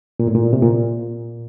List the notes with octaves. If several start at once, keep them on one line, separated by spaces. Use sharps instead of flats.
A#2
A2
A#2
C3
A#2